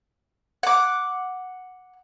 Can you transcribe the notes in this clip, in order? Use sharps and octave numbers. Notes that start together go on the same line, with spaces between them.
F#5 D6